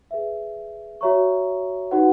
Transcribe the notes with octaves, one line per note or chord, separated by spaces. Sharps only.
G#4 B4 E5
F#4 C#5 E5 A#5 C#6
D#4 F#4 B4 F#5